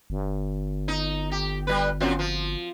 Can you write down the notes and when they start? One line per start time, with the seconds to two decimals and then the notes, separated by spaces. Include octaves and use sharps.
0.10 G1
0.88 D#4
1.31 G4
1.67 G3 B4
2.00 F#2 A#2 C4
2.19 F3